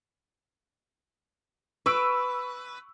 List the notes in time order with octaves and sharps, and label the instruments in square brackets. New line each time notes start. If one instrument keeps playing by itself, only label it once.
[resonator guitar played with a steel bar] B4 [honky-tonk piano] C#6 E6 D7